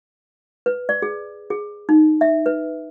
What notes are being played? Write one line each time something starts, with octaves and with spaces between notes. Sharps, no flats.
B4
D5
G#4
G#4
D#4
E5
B4